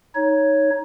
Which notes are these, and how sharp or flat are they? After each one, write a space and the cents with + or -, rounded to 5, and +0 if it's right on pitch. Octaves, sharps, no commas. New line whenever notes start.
D#4 +10 C#5 +0